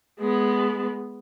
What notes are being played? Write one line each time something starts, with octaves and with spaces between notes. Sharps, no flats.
G#3 B3